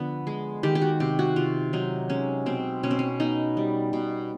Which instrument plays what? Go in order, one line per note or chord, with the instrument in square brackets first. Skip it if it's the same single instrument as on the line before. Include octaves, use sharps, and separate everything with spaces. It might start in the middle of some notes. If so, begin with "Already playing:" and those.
Already playing: [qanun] D3 F3 B3
G#3
D#3 G4
G4
F#4
C3 G4
F#4
C3 F4
F#3 D#4
G#3 C#4
B2 C4
B2 C#4
C4
C#4
B3 D#4
G3
B2